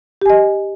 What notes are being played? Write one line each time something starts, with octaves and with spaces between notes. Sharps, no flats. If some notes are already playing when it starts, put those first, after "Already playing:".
G4 D#5 G#5